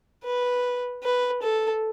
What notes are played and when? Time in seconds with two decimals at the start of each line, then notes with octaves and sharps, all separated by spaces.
0.24 B4
1.03 B4
1.42 A4